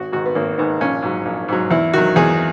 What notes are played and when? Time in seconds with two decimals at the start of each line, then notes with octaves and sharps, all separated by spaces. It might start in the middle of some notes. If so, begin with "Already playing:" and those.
Already playing: G#1 F#4
0.12 G#2 D#3 F#4
0.26 B3
0.35 G#1 A#3
0.58 G#2 D#3 B3
0.81 A#1 C#4
1.02 G#2 F#3
1.25 A#1
1.48 G#2 F#3
1.71 E2 E4
1.94 D#3 F#3 F#4
2.16 E2 G#4